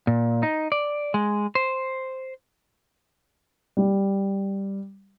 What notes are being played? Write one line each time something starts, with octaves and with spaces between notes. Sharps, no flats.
A#2
D#4
D5
G#3
C5
G3